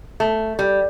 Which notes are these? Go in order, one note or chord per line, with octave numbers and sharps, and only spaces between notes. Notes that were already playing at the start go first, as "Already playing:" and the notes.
A3
G3